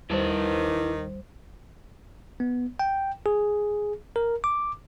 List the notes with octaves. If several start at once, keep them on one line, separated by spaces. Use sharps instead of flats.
D#2 D#3 G3 E4 B4 C5 A5
B3
G5
G#4
A#4
D6